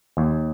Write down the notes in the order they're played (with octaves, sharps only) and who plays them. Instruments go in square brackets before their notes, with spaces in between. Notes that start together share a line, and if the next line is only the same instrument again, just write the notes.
[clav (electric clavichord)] D#2